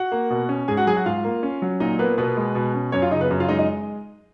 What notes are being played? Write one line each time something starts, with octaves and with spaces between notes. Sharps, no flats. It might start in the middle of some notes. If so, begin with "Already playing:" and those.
Already playing: F#4 F#5
A#3
B2
C#4
G#2 G#4 G#5
F#4 F#5
F#3 G#4 G#5
F#4 F#5
G#2 F4 F5
A#3
C#4
F#3
A#2 D#4 D#5
A#3 B3 B4
B2 B3 B4
G#3
B2
C#4
F#2 C#4 C#5
F4 F5
C#3 D#4 D#5
B3 B4
F#2
F4 F5
G#3 D#4 D#5
D#4 D#5